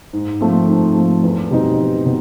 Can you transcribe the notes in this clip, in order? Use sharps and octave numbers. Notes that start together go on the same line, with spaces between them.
G#2
F3 A3 C4
G#2
F3 A3 C4
E2
B2 G3 C4 D#4
E2
B2